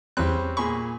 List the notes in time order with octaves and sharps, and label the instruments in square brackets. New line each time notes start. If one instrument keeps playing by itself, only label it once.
[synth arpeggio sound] E2 F#6 [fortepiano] G3 C4 C#4
[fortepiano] A#2 G#4 B5 [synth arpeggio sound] C#6